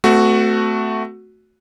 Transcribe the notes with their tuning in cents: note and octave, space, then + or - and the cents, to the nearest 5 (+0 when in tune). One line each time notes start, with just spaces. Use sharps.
A3 +0 C4 -40 F#4 +0